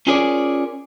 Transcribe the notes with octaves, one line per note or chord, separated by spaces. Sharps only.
C#4 F4 G#4 A#4 C#5 D5